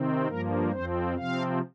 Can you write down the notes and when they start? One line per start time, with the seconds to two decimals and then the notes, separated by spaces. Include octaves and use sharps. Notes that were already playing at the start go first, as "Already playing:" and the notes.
Already playing: C3 D#3 C4
0.28 G2 F3 A#3 A#4
0.72 F2 F3 C4 C5
1.17 C3 F3 C4 F5